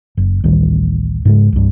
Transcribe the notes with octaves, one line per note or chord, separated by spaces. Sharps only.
F#1
A1 D2 D#3 G3
G#2 C#3 G#3
C2 G2